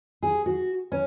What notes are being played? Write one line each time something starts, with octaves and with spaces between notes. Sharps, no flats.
G#4
F#4
C#4